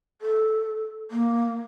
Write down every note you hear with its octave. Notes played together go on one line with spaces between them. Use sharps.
A4
A#3